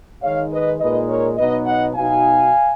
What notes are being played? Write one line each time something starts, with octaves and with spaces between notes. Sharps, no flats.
D#3 G#3 D#4 C#5 F5
B4 D#5
A#2 G#3 D#4 B4 D#5
A#4 C#5
B2 F#3 B3 D#4 B4 D#5
D#5 F#5
B2 F#3 B3 D#4 F5 G#5